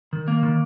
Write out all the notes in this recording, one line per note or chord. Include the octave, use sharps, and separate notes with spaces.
D#3
A#3
D#3